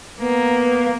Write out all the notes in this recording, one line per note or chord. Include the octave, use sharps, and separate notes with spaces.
A#3 B3